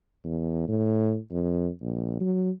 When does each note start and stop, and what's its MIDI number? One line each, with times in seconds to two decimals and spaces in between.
0.24 0.63 40
0.68 1.17 45
1.31 1.68 41
1.81 2.17 34
2.20 2.51 54